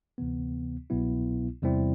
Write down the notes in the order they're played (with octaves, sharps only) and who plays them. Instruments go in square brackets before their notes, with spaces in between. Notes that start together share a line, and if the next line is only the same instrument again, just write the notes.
[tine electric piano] D2 C3 E3 B3
C2 B2 F#3 B3 E4
E2 C3 G3 C4 E4